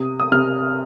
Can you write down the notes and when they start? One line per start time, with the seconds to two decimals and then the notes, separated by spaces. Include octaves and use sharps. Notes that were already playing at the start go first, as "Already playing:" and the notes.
Already playing: C3 D#6
0.20 D#6
0.32 C3 F6